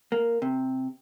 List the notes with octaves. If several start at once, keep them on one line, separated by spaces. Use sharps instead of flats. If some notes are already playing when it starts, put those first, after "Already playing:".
A#3
C3